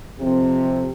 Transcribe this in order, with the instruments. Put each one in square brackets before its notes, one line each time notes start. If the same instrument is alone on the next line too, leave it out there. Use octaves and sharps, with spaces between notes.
[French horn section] F2 C3 C4 G4